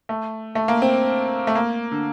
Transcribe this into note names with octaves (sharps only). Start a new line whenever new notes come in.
A3
A3
A#3
C4
A3
A#3
D3